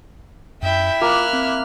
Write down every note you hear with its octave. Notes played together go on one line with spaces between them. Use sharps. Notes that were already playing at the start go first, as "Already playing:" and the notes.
F#2 E4 E5 G5 G6
A#3 F4 F6 F#6
C4